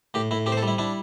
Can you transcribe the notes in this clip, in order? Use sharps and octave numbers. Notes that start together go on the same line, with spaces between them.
A2 G4
A2 E4
C4 G4
C5
A4
G3 E4
D4 E4